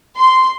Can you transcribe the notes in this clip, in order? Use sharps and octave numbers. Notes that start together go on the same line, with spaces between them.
C6